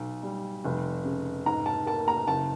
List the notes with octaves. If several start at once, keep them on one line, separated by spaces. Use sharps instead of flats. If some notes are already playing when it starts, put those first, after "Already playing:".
Already playing: B1
G3
F1
C#3
G#2 A#5
A5
A#3 A5
A#5
F#1 A5